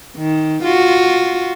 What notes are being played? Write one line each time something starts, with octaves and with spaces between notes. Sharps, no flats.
D#3
F4 F#4